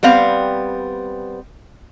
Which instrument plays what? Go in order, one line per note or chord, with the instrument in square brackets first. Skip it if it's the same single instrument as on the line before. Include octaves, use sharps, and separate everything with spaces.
[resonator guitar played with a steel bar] G3 B3 C4 F5